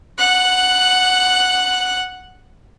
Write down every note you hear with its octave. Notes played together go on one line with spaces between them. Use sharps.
F#5 F#6